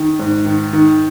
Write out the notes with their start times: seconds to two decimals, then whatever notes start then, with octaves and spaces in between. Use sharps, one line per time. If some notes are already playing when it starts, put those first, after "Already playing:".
Already playing: D#3
0.19 G#2
0.46 D#3
0.73 D#3